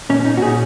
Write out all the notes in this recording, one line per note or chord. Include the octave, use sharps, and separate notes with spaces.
A#2 C#4
C#4
D#4
F#4
A#2 G#4